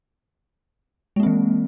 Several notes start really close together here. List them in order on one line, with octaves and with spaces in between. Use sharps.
G#3 A#3 C4 E3